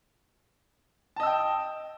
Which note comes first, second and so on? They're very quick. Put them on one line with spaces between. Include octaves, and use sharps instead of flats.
A5 D#5 E6 G5